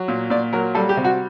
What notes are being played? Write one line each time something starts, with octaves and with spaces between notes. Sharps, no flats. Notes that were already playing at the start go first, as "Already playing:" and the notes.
Already playing: F#3
A#2
A#2 D5
F#3 A#4
G3 A4
G4
C3
F#4